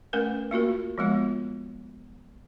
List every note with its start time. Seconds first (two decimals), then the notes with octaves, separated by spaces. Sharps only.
0.13 A3 C#4 A#4 B4
0.51 A#3 F4 F#4 A#4
0.98 F3 G#3 B3 F4